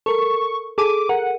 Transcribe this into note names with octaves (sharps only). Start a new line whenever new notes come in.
A4 A#4 C#6
G#4 A4 D6 D#7
A#4 F#5